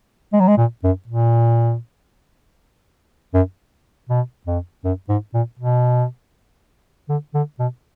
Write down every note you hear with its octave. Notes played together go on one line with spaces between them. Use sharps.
G#3
F#3
G#3
A#2
F#2
A#2
F#2
B2
F2
F#2
G#2
A#2
B2
D3
D3
B2